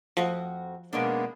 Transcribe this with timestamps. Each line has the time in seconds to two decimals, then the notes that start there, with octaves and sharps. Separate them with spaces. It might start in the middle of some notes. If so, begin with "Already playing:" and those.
0.17 F2 F3 F#4 D#5
0.93 B2 G#3 A#3 B3 C#4 D4